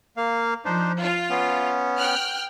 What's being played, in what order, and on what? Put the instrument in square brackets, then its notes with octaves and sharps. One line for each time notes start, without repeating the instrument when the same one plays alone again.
[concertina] A#3 F5
[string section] F3 [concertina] D4 D#4 C5
[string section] F4 [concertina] F5
[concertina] B3 C#4
[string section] G5 F6 F#6